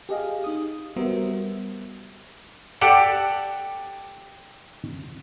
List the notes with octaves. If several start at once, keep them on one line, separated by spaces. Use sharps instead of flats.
G4 G#4 D#5 F5
D#4 D#6
G3 B3 F#4 A#4 C5 E5
G4 A4 D5 F#5 A5